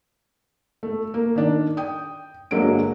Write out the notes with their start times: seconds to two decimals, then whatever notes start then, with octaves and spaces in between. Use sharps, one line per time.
0.83 A3
1.14 A#3
1.36 D#3 D4
1.77 G5 D#6
2.51 G1 D3 F#3 G#3 A#3 D7